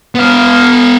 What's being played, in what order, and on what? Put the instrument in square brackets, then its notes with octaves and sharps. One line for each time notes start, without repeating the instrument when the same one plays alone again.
[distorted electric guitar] B3 F5